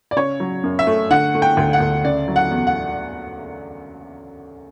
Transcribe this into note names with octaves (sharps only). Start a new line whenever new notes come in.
D5
C#3 C#5
F#3
F#2
E5
A3
D3 F#5
A3
G5
D2
F#5
D2
C#3 D5
F#3
F#5
E2
F#5